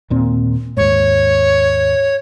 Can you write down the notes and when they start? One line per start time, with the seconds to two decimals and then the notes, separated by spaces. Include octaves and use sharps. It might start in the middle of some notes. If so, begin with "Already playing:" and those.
0.10 D#2 A#2 C4
0.77 D#2 G#2 C#5